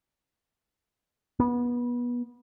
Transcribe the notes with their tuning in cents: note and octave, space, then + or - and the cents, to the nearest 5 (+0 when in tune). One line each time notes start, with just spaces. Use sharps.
B3 -25